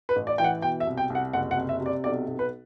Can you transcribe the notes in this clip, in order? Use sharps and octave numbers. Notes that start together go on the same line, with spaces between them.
B4
A1
D5
E3 G5
F#5
B2 G5
E5
C2
G5
C2
F#5
F#1 F#5
F#5
C3
E5
C3
D5
B1 D5
B1
B4